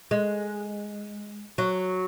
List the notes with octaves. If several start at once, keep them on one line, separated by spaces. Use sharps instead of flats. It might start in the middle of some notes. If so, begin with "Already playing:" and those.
G#3
F#3